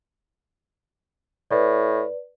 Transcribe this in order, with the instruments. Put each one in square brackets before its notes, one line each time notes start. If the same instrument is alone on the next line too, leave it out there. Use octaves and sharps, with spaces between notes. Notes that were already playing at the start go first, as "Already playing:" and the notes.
[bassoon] A2 [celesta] B4 D5